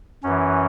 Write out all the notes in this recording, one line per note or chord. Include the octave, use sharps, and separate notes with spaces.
F#2 E3 C#4